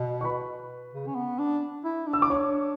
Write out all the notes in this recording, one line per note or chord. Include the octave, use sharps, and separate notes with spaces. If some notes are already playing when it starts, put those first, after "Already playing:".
Already playing: B2
C#6
B4 B5
C#3
C#4
B3
D4
E4
D4
E6
D6
D4 C#5 C#6